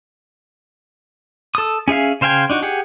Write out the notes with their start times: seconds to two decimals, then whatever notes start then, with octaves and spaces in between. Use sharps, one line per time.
1.55 A4 D#6
1.88 C#4 G#4 E5 F5
2.21 C#3 C5 F5 G5 G#5
2.50 D4 D#4 F#4
2.62 G4 G#4 F#5